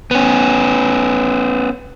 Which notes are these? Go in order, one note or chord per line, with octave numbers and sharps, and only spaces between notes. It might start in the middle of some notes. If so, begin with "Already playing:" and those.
B3 C#4